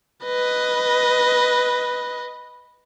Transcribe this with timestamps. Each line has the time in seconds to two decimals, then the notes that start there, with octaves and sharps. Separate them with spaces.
0.25 B4 D#5